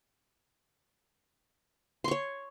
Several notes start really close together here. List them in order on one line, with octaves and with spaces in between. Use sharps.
C6 C#6 C#5